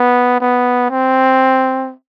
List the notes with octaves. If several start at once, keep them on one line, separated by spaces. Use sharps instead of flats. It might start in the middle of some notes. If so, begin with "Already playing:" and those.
Already playing: B3
B3
C4